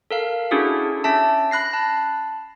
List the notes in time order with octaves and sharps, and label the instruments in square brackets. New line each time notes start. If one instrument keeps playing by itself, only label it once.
[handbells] A4 A#4 F5
C#4 D4 E4 F#4 G#4 A4
C#4 E5 A5
B5 F#6 A#6 C7
A5